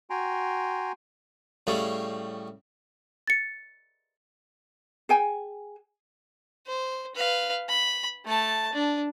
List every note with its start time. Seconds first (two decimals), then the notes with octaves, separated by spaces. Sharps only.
0.10 F#4 G5 G#5 A#5 C6
1.67 A2 C#3 G3
3.27 A6 C#7
5.09 G#4 G5 G#5
6.67 C5
7.15 B4 F5
7.68 B5
8.25 A3 A5
8.73 D4